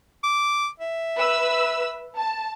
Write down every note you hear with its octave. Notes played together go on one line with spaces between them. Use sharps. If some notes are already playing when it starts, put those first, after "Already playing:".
D6
E5
B4 E6
A5